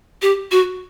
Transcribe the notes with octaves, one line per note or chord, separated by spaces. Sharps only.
G4
F#4